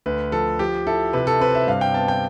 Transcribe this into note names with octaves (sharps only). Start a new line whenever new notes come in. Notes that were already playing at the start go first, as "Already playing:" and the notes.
D2 B4
F3 A4
F3 G4
E4 A4
C3 B4
A4
C4 B4
E5
G2 F5
G5
B3 A5
G5